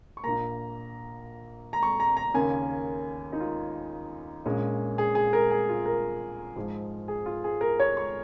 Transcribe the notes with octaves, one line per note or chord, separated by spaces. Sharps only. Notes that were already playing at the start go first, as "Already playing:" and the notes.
C#6
A#1 A#2 A#3 A#5
A#5
C#6
A#5
A#5
D#2 C#3 A#3 C#4 G#5
D#4
F4
A#1 A#2 G#3 C#4
G#4
G#4
A#4
G#4
F4
A#4
G#2 F3 G#3
G#4
F4
G#4
A#4
C#5
C#6